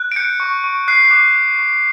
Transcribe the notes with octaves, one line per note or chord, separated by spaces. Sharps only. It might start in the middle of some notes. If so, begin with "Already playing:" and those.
Already playing: F#6
D7
G6 C#7
C#6
C#6
F#6 C7
D6
F#6
C#6